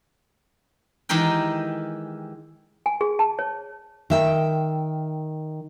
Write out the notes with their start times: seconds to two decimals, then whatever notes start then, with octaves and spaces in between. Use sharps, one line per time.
1.09 D#3 E3 G#3 G4 A#4 G5
2.86 G#5
3.01 G#4
3.19 A5
3.39 C#5
4.10 D#3 E5 G5